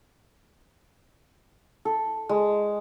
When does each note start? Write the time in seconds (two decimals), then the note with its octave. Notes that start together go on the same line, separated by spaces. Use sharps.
1.85 A4
2.29 G#3